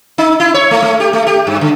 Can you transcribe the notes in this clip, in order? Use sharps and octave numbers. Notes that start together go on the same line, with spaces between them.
D#4
E4
C#5
A3
A3
G4
A3
G4
G2
D3